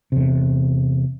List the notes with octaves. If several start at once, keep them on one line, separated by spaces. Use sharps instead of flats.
E2 C3